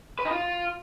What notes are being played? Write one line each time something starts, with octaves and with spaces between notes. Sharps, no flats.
B4
D#4
F4